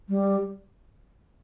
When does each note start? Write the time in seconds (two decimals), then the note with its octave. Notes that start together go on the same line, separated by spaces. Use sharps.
0.09 G3